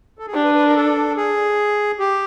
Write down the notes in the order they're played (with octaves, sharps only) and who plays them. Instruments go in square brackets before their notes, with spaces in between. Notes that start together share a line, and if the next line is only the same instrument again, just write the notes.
[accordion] A4
G#4
[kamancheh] D4 [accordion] G4
[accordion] B4
B4
A#4
A4
G#4
G4